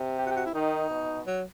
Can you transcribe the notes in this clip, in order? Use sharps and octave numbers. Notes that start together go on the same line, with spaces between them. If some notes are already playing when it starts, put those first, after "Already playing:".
Already playing: C3
G4
F#4
G4
F#4
E4
D#3 D#4
B2
F#3